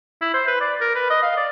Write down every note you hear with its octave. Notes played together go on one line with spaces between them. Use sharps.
E4
C5
B4
D5
A#4
B4
D#5
F5
D5